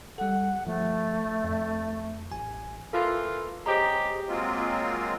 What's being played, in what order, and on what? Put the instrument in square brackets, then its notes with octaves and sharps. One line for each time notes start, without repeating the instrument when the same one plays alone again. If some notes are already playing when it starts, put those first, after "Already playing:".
[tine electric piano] G3 A4 [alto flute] F#5
[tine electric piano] G1 F3 [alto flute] A3
[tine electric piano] F2
A1 G#5
[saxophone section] E3 A#3 F4 [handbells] A4
[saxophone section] G#3 C#4 G4 [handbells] C5 D#5 A#5
[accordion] F#3 G#3 A#3 C4 F4